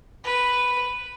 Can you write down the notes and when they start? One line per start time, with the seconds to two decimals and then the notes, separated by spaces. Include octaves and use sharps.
0.24 B4